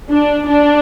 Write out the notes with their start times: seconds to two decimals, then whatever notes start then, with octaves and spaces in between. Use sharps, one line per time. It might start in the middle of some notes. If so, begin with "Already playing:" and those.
0.11 D4
0.49 D4